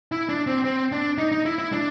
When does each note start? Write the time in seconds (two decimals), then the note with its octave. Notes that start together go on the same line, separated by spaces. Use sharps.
0.12 E4
0.29 D4
0.47 C4
0.65 C4
0.92 D4
1.18 D#4
1.32 D#4
1.45 E4
1.58 E4
1.72 D4